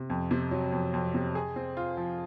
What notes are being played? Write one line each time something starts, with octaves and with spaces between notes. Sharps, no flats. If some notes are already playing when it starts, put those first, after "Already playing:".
Already playing: C3
F2
C3
F#3
F2
F2
C3
G#4
C4
F4
F3